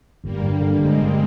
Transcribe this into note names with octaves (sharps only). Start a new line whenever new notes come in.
G1 G3 A#3
G2
D3
G1 G#3 C4
G1